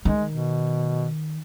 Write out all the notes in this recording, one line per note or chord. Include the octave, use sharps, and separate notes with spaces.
D#3 G#3
B2